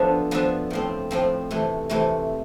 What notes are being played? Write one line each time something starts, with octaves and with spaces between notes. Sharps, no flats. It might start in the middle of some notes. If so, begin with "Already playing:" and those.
Already playing: F3 B3 D4 A4 B4 E5
F3 B3 D4 A4 E5
A2 F3 C4
A2 F3 C4
C3 E3 A3
C3 E3 A3